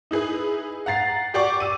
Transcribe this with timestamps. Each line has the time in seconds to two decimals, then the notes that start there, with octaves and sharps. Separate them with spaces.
0.11 D#4 E4 G#4 B4
0.86 F#5 A#5 A6 C7
1.34 F#4 G4 D5 C#6 D6
1.60 E6 D#7